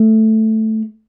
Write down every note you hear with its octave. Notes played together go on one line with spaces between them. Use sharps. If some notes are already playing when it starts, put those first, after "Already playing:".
Already playing: A3